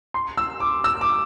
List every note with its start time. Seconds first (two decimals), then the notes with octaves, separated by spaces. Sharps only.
0.14 C6
0.37 E6
0.60 D6
0.84 E6
1.01 D6